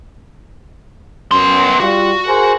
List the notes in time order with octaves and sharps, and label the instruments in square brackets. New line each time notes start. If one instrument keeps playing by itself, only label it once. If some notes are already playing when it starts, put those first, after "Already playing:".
[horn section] F#2 [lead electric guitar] B3 C6
[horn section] G3 F4 [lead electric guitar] F#4
[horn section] G#4 A#4 C5